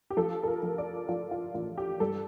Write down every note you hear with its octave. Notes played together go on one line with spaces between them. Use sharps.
G4
F3 A4
A4
A#4
F3
D5
F3 F4
F4
A1 F4
G4
G2 A4